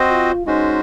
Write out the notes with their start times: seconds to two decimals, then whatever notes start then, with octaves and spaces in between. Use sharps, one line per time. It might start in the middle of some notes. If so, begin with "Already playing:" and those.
Already playing: C4 F#4 C5 D#5
0.09 F4
0.46 G#3 C#4 D#4 F#4 C5